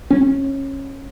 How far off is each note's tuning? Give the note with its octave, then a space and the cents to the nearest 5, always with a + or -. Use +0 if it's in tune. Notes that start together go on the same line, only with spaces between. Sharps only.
C#4 -20